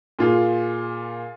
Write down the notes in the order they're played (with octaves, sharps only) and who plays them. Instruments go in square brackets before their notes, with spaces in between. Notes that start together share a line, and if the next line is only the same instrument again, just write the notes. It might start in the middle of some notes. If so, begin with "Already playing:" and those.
[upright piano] A#2 F4 G#4